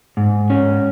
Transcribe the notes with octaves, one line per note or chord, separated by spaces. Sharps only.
G#2
C#4